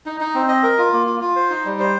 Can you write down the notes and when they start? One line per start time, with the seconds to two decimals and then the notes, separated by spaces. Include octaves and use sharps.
0.06 D#4
0.20 D#4
0.34 C4
0.48 D#5
0.63 A#4
0.78 F4
0.93 A#3
1.07 F4
1.21 F4
1.36 C5
1.50 D#4
1.65 G3
1.79 C5